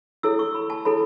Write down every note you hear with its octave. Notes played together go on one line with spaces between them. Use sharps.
E4 A4 C#5 E6
C#6
B5
A5
E4 A4 C#5 B5